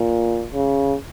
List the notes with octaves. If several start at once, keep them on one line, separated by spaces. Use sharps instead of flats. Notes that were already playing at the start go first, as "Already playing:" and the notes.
Already playing: A#2
C#3